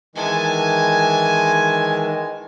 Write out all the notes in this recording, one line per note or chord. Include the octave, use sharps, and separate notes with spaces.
D#3 E3 G#3 G#5 A5